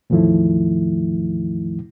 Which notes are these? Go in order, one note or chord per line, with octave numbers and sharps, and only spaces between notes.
E2 A2 D#3 F3 A3 E4